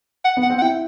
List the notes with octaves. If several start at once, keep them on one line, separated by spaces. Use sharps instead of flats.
F#5
B3
F#5
C4
F#5
E4 G5